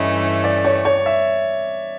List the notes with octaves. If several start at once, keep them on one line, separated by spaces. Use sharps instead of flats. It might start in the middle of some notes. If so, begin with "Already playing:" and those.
Already playing: G2 E3 A3 C#4 D#5
D5
C#5
C#5
E5